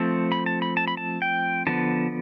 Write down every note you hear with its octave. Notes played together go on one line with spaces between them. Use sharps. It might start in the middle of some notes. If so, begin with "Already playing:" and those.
Already playing: F3 A3 C4 A5
B5
A5
B5
A5
B5
A5
G5
D3 F3 B3 A5